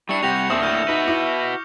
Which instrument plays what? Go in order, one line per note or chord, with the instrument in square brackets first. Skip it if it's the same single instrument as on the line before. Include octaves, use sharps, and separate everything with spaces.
[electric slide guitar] G3 D4 [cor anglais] E4 [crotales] C#6 C#7
[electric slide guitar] C3 G3 [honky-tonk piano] G4 [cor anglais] F#5 [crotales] G6 A#6 F7
[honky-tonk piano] D#2 D#6 F#7 [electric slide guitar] C4 D4 [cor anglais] E5
[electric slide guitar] A2 D3 [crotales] F6 G6
[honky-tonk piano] D#4 [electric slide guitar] F#4 B4
[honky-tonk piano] E4 [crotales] D6